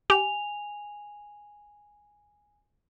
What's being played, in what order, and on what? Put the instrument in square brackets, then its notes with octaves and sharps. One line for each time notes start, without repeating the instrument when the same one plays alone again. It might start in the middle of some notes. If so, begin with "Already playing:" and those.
[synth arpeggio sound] G4 [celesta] G#5 F7